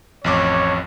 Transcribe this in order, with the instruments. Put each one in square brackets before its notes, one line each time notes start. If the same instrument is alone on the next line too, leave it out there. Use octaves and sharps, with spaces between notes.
[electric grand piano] A1 F2 D6 [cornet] C#5